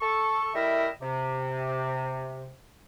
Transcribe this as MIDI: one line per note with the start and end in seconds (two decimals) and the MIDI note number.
0.01 0.49 69
0.01 0.49 85
0.55 0.89 55
0.55 0.89 57
0.55 0.89 64
0.55 0.89 70
0.55 0.89 75
0.55 0.89 76
1.02 2.52 48